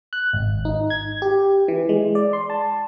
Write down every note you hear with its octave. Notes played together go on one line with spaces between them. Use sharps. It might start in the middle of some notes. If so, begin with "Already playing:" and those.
F#6
G#1
D#4
G#6
G4
E3
G#3
D5
C6
A5